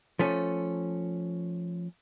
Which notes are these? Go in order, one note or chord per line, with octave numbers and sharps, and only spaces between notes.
F3 A3 C#4